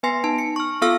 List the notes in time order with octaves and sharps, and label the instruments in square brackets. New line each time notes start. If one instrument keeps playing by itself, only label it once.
[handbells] B3 B4 G#5 C6 A#6 C7
D#4 A5
C#7
C#6 F6
B3 F4 A4 F5 E6 F6